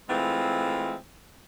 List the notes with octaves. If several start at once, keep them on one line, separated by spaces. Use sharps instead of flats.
E3 G#3 A3 C4 F4